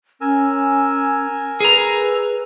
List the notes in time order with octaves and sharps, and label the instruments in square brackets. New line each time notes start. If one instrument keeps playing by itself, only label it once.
[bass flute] C#4 [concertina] A#4 G#5 E6
[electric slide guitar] G#4 A#5 [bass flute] B4